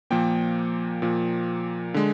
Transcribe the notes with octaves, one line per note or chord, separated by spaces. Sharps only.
A#2 F3 A#3 G5
A#2 F3 A#3
D3 G#3